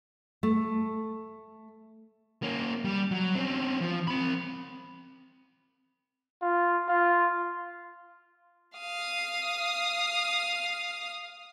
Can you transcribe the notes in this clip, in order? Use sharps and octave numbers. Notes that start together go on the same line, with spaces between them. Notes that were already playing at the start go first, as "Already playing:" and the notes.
A3
A#3 C#4
G3
F#3
C4 C#4
F3
C4 B5
F4
F4
F5 D#6